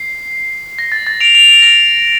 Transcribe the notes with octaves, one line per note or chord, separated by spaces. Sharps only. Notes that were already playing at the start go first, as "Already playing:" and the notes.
Already playing: C7
A#6
A6
A6
D7 F7
D7 F7
D7 F7
A#6 D7